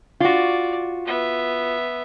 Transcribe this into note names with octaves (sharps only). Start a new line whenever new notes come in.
F4 F#4 D5
B3 E5